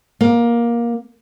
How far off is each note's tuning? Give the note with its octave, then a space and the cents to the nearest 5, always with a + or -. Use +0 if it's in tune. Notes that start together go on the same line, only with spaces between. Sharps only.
A#3 +15